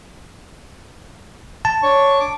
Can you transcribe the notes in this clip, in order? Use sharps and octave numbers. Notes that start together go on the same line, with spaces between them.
A5
D4 C#5 C#6
D6